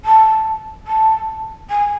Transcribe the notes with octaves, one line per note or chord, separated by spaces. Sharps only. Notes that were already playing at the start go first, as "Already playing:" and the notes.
A5
A5
G#5